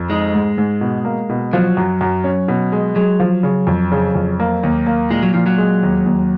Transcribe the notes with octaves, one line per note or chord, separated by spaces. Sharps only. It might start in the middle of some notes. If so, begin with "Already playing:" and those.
Already playing: F2
G#3 D#4
G#2
G#2
B2
A#3
B2
F3 F#3
F#2
F#2
C#4
B2
G#3
F#3 G#3
F3
C#3
F2
C#3
F2
A#3
D#2
A#3
A#2 G#3
F#3
A#2 F3
F#3
G#3
D#2
D#2